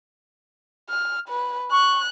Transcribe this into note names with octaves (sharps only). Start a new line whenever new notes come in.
F6
B4
C#6 F#6